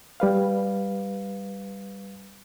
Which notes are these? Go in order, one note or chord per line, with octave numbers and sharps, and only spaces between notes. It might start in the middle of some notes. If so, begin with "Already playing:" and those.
G3 B4 F5